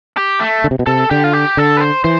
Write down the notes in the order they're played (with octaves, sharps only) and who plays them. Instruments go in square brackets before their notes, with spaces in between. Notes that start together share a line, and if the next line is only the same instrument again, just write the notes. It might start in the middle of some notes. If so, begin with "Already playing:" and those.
[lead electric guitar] G4
A3
[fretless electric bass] D3
C3
B2
[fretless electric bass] C3 [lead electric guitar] A4
[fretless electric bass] D3 [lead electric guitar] G4
[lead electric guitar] F4
G4
[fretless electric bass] D3 [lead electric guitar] A4
[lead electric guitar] B4
C5
[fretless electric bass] E3 [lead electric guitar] C5